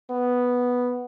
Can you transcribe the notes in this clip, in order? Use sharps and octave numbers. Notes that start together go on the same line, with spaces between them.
B3